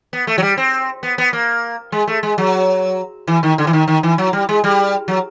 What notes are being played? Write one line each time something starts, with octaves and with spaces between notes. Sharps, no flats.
B3
A3
F#3
G3
C4
B3
B3
A#3
G#3
A3
G#3
F#3
E3
D#3
D3
E3
D#3
D#3
E3
F#3
G3
G#3
G3
F#3